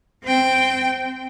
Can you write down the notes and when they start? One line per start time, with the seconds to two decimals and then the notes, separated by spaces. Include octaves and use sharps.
0.23 C4 G5